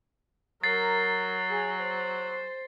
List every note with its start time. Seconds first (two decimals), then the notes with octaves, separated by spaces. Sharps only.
0.64 F#3 A#4 A6 C7
1.50 G#4
1.79 C5